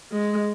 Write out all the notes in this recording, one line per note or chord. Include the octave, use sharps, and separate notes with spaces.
G#3